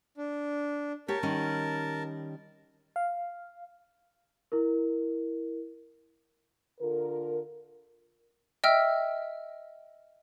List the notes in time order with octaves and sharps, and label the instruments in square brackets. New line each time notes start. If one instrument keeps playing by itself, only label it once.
[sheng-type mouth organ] D4
[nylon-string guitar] G4 C#5 [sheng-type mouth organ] A#4 A5
[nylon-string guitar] D#3 G3 C#4
[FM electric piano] F5
[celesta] E4 A#4
[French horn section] D3 F4 A4 A#4
[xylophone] D#5 E5 G5 E6 F6